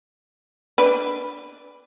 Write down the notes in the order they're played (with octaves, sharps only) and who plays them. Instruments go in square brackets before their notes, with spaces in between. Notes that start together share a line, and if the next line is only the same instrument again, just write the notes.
[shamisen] D4 B4